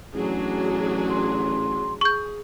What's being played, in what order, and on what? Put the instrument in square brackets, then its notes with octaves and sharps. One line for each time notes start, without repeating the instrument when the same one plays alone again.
[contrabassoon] A1 [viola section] F#3 D4 G#4
[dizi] C6
[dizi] G#4 [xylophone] C#6 G6